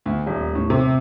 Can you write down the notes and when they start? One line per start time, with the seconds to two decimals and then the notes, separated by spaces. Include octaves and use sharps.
0.06 D2
0.27 D#1
0.55 A2
0.70 C3